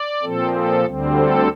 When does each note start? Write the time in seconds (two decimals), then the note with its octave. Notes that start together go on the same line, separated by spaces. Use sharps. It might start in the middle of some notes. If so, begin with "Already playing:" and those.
Already playing: D5
0.22 A#2 F3 C4 A4
0.53 A4
0.85 D2 D3 G3 C4
1.16 A4